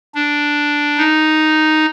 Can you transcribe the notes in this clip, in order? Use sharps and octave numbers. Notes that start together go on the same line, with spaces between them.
D4
D#4